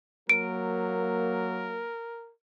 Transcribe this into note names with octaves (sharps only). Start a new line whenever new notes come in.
F#3 A#3 A#4 D7